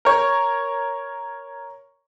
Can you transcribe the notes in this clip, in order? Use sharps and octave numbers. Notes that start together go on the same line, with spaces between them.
A#4 C#5